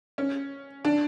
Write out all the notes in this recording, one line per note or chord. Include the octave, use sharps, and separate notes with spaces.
C#4
D4